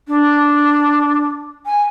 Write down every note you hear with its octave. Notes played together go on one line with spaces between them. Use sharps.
D4
G#5